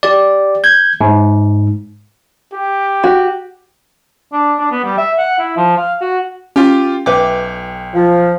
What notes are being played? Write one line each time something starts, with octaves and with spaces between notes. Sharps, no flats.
G4 D5
G6 G#6
G#2
G4
F#4
D4
D4
B3
G3
E5
F#5
E4
F3
F5
F#4
C#4 F4 G4
B1 B4 E5 G5 D6
F3